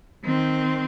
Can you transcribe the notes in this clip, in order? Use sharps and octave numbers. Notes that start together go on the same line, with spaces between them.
D#3 C4